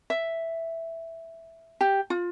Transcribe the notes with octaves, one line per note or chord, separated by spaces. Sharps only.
E5
G4
F4